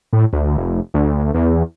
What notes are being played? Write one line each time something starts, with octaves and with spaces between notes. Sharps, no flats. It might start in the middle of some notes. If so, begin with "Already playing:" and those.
A2
D2
F1
D2
E2